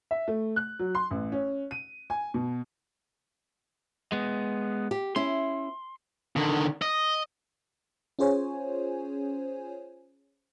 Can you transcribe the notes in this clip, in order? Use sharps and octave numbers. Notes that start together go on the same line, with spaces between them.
E5
A3
F#6
F#3
C6
A1
C#4
D#7
G#5
B2
G#3 B3
G4
C#4 E4 C6
D3 D#3
D#5
C#4 F4 G#4 C5 C#5 G#5